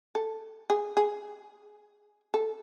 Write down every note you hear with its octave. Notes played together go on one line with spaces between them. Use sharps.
A4
G#4
G#4
A4